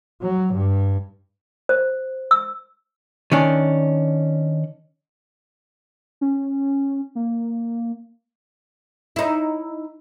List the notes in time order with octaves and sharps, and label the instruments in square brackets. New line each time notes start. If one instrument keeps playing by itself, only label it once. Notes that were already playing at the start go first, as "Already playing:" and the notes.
[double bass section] F#3
G2
[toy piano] C5
E6
[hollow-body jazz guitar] D#3 C#4 D4
[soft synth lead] C#4
A#3
[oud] D#4 E4